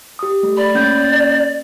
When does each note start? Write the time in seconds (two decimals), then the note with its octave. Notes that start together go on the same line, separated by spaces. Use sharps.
0.19 G4 D#6
0.43 A3
0.57 D5 B5
0.75 A#3 C#4 G6